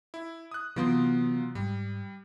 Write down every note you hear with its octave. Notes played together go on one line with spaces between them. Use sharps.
E4
D#6 F#6
C3 E3 F#3 B3 F4 C6
G#2 G3